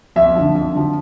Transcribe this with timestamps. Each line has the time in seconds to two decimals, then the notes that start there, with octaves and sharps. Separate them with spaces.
0.16 F2 E5
0.35 D3 F3
0.55 F2
0.73 D3 F3